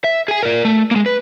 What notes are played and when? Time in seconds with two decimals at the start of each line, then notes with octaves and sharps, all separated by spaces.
0.04 E5
0.28 G#4 G#5
0.43 A#4 D5
0.65 A3
0.91 G#3 A#3
1.06 B4